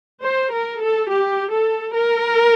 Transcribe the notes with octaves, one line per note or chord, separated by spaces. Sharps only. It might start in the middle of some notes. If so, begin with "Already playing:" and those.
C5
A#4
A4
G4
A4
A#4